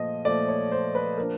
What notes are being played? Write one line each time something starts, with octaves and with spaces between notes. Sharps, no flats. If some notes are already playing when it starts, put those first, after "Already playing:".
Already playing: A#2 F3 A3 D#5
A#2 F3 A3 D5
C#5
C5
B4
F3 A#3 D4 A#4